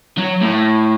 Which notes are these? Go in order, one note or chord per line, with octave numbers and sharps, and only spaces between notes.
F#3
A2